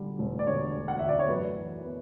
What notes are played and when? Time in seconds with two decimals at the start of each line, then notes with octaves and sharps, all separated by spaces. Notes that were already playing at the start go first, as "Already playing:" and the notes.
Already playing: D3 G3
0.19 E1
0.39 D5
0.46 D3 C#5
0.74 D2
0.88 F#5
0.99 D2 E5
1.09 D5
1.19 C#5
1.29 F#2 B4
1.56 E3
1.84 B3